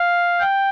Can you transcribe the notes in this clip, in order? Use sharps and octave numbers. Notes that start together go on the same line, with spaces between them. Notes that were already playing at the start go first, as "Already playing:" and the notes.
Already playing: F5
G5